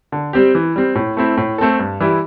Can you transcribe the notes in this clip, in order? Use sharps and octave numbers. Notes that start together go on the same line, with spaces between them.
D3
G3 C4 G4
E3
G3 C4
A2
A3 C4 E4
A2
A3 C4 A4
G2
E3 G3 E4